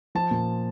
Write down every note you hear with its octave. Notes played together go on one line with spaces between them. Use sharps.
F3 A5
A#2